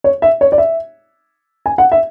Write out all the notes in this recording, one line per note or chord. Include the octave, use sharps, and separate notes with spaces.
C#5
E5
C#5
D5
E5
G#5
F#5
E5